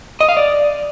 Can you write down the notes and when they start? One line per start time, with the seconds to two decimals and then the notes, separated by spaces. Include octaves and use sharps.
0.21 D#5
0.29 F5
0.37 D5